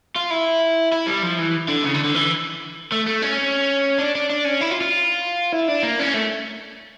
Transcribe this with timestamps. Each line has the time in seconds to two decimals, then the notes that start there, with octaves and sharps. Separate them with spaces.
0.16 F4
0.30 E4
0.92 E4
1.07 G3
1.23 F3
1.39 E3
1.68 D3
1.84 C#3
1.95 D3
2.05 D3
2.15 E3
2.92 A3
3.06 A3
3.22 C#4
3.99 D4
4.15 D4
4.29 D4
4.45 C#4
4.61 E4
4.71 F4
4.81 F4
5.52 E4
5.68 D4
5.83 A#3
5.99 C#4
6.14 A3